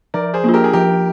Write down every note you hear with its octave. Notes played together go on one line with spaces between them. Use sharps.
F3 A#4 D5
G#4 C5
A#3 D4 F4
G4 A#4
G#4
F3 G4 A#4